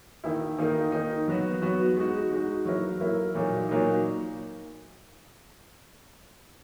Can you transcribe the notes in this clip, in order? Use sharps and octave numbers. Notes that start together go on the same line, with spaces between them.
D#3 A#3 E4
D#3 A#3 D#4
D#3 A#3 D#4
F#3 B3 F#4
F#3 B3 F#4
G#3 D#4 F#4
G#3 D#4 F#4
F#3 A#3 E4 A#4
F#3 A#3 E4 A#4
A#2 F#3 A#3 D#4
A#2 F#3 A#3 D#4